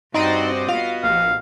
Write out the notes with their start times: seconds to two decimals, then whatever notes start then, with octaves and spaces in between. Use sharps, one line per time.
0.14 G2 C4 D#4 F#4 C5 D5 D#5
0.68 B3 F4 F#4 D#5 F5
1.03 A#1 F5